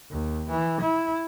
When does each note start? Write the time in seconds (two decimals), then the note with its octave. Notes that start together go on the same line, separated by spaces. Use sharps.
0.11 D#2
0.50 E3
0.81 E4